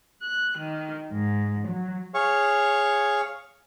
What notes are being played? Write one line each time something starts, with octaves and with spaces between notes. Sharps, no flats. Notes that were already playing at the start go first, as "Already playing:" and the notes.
F#6
D#3
G#2
F#3
G#4 C#5 F5 C#6